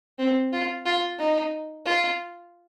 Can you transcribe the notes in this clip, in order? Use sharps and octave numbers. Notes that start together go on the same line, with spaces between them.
C4
F4
F4
D#4
F4